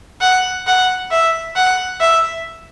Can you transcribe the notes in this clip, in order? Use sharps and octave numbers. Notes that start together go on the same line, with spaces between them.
F#5
F#5
E5
F#5
E5